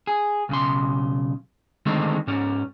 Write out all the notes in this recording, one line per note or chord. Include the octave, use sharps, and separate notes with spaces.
G#4
B1 C#3 C6
D3 D#3 G#3 A3 C4 D#4
G#2 C#4